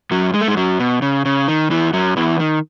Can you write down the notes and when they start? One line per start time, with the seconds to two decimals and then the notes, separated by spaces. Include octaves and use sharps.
0.11 F#2 F#3
0.34 G#3
0.41 A3
0.48 G#2 G#3
0.57 F#2 F#3
0.79 B2
1.02 C#3
1.25 C#3
1.48 D#3
1.70 E2 E3
1.93 F#2 F#3
2.17 E2 E3
2.39 D#3